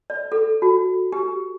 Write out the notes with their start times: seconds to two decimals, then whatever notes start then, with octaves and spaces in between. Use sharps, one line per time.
0.10 D5
0.32 A4
0.62 F#4
1.12 G4